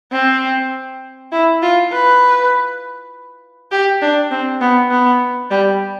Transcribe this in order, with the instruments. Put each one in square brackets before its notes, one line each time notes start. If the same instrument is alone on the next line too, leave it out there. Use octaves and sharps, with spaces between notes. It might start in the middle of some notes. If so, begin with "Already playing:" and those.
[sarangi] C4
E4
F4
B4
G4
D4
C4
B3
B3
G3